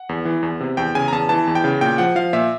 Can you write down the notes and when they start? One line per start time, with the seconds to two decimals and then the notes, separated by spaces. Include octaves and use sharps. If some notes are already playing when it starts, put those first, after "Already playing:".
Already playing: F#5
0.09 E2
0.25 E3
0.43 E2
0.60 C3
0.77 E2 G5
0.95 C#3 G#5
1.08 A#5
1.12 E2 A5
1.29 E3 A5
1.47 E2
1.55 G5
1.64 C#3
1.81 A#2 G5
1.98 F3 F#5
2.15 F3 F5
2.33 A#2 E5